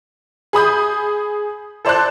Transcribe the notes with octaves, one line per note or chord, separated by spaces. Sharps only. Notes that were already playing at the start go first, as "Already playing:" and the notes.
G#4 B5 D#6 G6
A4 C5 D5 A5 C6 F#6